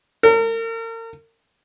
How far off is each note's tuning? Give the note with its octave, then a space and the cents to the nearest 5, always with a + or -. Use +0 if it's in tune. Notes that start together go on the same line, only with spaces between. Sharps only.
A#4 -40